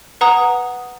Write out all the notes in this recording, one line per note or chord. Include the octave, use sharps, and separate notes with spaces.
B4 F#5 A#5 D#6